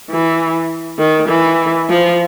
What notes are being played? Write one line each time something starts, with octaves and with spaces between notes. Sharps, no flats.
E3
D#3
E3
F3